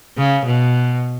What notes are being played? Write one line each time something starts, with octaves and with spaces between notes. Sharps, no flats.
C#3
B2